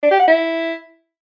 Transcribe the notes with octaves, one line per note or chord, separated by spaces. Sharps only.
D4
G4
F#5
E4